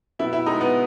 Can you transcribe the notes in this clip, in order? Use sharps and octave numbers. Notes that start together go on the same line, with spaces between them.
B2 E4
E4
G#3 D#4
B3